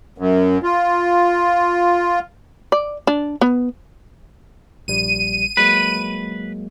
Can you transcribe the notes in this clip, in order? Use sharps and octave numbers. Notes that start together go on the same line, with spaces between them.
F#2
F4
D5
D4
B3
A#1 G3 D#7
F#3 G#3 A#3 B4